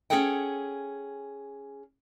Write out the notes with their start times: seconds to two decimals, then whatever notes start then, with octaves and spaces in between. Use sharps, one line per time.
0.10 C#4 E4 G#4 A4 F#5 G5